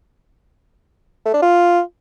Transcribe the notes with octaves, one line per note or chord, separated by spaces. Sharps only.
A3
D4
F4